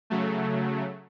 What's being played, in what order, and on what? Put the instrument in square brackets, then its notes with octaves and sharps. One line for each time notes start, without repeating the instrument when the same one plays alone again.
[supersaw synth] C#3 F#3 A3